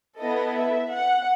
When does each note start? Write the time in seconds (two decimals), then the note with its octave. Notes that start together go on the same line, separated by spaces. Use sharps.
0.20 B3 E4 A4 D#5
0.56 E5
0.93 F#5